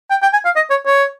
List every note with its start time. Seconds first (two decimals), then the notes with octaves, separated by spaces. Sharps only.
0.10 G5
0.22 G5
0.33 G#5
0.45 F5
0.56 D#5
0.70 C#5
0.86 C#5